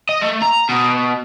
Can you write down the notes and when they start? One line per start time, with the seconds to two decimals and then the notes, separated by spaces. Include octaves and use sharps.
0.09 D#5
0.21 A3
0.42 A#5
0.69 B2